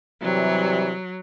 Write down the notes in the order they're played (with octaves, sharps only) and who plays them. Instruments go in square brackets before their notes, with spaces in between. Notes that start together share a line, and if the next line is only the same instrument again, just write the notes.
[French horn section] C3 E3 G3 [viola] F#3